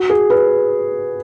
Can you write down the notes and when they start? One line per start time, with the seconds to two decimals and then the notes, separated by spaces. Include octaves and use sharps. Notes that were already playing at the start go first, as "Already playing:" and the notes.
Already playing: F#4
0.10 G#4
0.30 B4